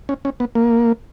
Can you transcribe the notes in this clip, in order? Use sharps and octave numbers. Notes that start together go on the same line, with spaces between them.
C#4
C#4
B3
A#3